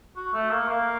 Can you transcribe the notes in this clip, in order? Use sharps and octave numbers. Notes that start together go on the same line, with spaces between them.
F#4
A3
A#3
A#3